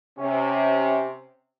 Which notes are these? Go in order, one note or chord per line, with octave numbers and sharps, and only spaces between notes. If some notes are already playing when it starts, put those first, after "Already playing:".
C3 C#4